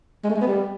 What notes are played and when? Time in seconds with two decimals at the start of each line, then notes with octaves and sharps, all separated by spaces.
0.24 G#3
0.30 A3
0.35 G#3
0.41 B3
0.47 G3